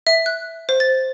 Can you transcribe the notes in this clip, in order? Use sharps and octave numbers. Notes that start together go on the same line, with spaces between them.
E5
F#6
C5
A6